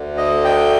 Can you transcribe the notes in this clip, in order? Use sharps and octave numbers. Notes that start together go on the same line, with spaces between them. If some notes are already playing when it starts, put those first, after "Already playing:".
Already playing: D2 D3
D#5
G5